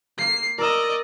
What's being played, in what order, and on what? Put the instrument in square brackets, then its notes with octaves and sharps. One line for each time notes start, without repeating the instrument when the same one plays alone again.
[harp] A#3 [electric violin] C7
[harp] A#4 E6 [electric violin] D5 D#5